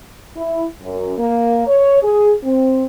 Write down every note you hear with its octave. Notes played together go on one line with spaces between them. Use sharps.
E4
F#2
A#3
C#5
G#4
C4